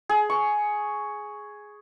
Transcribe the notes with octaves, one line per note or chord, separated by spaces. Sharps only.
G#4
C#6